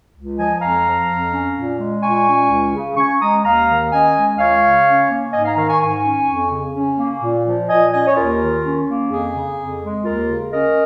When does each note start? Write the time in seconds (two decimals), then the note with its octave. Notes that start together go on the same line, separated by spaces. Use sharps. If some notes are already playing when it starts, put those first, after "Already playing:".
0.15 C#2
0.37 F3 D#5 G#5
0.61 F2 F5 A#5
0.85 F3
1.08 F2
1.32 C#4
1.55 A#2
1.79 G#3
2.02 A#2 G#5 C#6
2.27 C#4
2.50 C#2
2.74 C#3
2.97 C#4 G#5 C#6
3.20 G#3 A#5 D#6
3.44 D#2 F5 A#5
3.68 D#3
3.91 C#4 D#5 G#5
4.15 G#3
4.38 C#2 C#5 F5
4.62 C#3
4.86 C#4
5.09 A#3
5.33 G#2 D#5 G#5
5.45 F5 A#5
5.56 D#3 F5 A#5
5.68 G#5 C#6
5.80 G#2 G#5 C#6
6.03 C#4
6.27 F2
6.51 C#3
6.74 C#4
6.98 A#3
7.21 A#2
7.45 F3
7.69 A#2 D#5 G#5
7.92 C#4 D#5 G#5
8.06 C#5
8.16 D#2 F4 A#4
8.40 D#3
8.63 C#4
8.87 A#3
9.10 F2 G#4
9.34 C#3
9.57 F2
9.82 G#3
10.04 D#2 F4 A#4
10.29 C#3
10.52 C#4 A#4 D#5